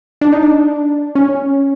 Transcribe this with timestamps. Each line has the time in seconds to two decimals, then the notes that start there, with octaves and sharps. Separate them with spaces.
0.21 D4
0.32 D#4
0.43 D4
1.15 C#4